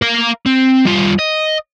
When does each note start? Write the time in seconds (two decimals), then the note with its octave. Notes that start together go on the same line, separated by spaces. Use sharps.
0.02 A#4 F5
0.46 C4
0.85 G3 F4
1.19 D#5